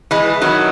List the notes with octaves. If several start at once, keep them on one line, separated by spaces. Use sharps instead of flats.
E3 G#3
D#3 F#3